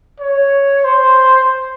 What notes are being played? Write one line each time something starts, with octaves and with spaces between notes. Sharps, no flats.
C#5
C5